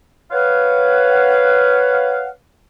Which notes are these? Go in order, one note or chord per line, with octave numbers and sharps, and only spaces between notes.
B4 C#5 F5 F#5